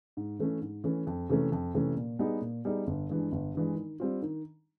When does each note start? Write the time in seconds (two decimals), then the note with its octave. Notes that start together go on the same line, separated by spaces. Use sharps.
0.17 G#2
0.39 E3 A3 C#4
0.62 G#2
0.84 E3 A3 C#4
1.07 F2
1.29 C3 E3 A3 C#4
1.52 F2
1.74 C3 E3 A3 C#4
1.97 A#2
2.19 G3 B3 D#4 G#4
2.41 A#2
2.65 G3 B3 D#4 G#4
2.87 G1
3.10 G2 E3 G#3
3.32 G1
3.54 G2 E3 G#3
3.77 D#3
4.00 G3 C4 F4
4.22 D#3